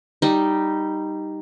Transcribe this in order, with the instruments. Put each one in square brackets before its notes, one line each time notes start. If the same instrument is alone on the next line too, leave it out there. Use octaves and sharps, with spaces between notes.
[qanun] G3 D#4